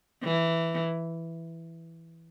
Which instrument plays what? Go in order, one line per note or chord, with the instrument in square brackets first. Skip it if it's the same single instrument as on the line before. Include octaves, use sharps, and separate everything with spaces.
[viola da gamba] E3